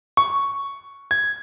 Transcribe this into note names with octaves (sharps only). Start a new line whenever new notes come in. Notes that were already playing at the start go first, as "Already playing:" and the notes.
C#6
G#6